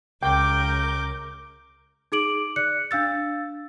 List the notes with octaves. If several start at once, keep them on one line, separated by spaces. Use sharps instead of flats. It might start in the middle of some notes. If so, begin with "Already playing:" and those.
C#2 A#4 G5 D6 G6
D#4 G#4 D6 D7 F#7
D5 F#6 C#7
D4 F5 E6 A6